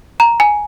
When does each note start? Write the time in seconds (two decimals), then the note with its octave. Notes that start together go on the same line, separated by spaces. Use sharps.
0.20 A#5
0.40 G#5